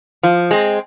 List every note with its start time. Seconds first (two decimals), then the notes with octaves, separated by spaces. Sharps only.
0.23 F3
0.51 G#3 C4